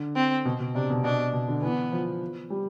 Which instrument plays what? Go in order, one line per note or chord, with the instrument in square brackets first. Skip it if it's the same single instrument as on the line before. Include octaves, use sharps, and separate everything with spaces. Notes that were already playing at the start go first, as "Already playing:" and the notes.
Already playing: [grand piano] D3
[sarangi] C4
[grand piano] B2
B2
[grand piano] C3 [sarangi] D4
[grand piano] B2
[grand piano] B2 [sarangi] D4
[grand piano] B2
D3
[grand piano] E3 [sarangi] B3
[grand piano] F3
G3